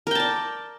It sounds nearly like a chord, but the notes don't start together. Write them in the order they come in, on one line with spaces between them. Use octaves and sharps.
A#4 G5 A5 D5